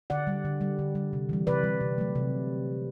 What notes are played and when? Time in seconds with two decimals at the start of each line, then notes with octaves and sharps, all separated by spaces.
0.10 D3 D5 F#5
0.27 G3
0.45 D3
0.61 G3
0.79 D3
0.95 G3
1.13 C3
1.29 E3 G3
1.47 C3 B4 D5
1.63 G3
1.81 C3
1.98 F#3 A3
2.15 C3